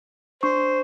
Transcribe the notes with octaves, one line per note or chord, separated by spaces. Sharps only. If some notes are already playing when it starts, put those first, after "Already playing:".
D4 C5 C#6